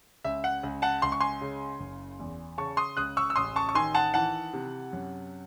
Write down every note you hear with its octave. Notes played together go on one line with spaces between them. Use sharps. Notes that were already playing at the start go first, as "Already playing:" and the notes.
C#2 E5
F#5
C#2
F#5 A5
C#2 C6
C#6
G#5 C6
C#3
F#1
E2
C#3 A5 C#6
C6 D#6
C#2 D#6 F#6
C#6 E6
E6
A1 C6 D#6
A5 C#6
C#6
D#3 G#5 C6
F#5 A5
E3 F#5 A5
C3
F#2